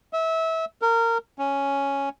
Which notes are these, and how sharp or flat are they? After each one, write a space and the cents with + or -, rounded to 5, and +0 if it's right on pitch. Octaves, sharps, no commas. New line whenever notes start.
E5 -25
A#4 -20
C#4 +0